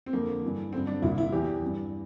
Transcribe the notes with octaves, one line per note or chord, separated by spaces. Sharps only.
C4
F2 D3 A#3
G2 E3
G2 D3 C4
D4
C2 A#2 E4
E4
E2 E3 G4
G2 E3